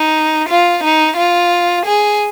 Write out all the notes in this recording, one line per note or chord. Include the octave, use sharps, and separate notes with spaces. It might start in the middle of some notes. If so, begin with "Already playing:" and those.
Already playing: D#4
F4
D#4
F4
G#4